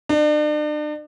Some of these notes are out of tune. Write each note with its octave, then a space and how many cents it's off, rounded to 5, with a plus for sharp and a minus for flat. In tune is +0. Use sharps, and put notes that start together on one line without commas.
D4 +40